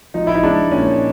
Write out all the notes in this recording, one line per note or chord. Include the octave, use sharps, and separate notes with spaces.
F3 D#4
E4
D#4
G#3 D4
A#2 C#4